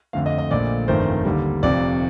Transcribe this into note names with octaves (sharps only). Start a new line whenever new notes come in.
F2 D3 A3 F5
D#5
D#5
A#1 A#2 A3 D5
G1 F2 D#3 A3 C5
D#2 D3 G3
F1 F2 C3 D5